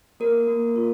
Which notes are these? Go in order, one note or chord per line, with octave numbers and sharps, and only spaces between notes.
A#3 A#4
A#3
F4